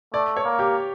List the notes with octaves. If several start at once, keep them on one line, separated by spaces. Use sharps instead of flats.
A3 D5
C#5
A#3
G4